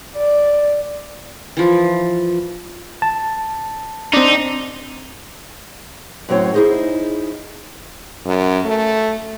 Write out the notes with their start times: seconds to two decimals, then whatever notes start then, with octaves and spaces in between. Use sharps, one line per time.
0.17 D5
1.57 E3 F3
3.02 A5
4.13 C4 D4 D#4
6.29 F#2 A2 F#3 C4 C#5 F#5
6.54 D#4 E4 G#4 C5 D#5
8.27 F#2
8.66 A3